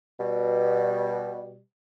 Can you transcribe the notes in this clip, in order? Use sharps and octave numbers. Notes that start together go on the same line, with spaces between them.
B2 G3